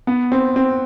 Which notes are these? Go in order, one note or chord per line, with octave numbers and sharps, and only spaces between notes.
B3
C4
C4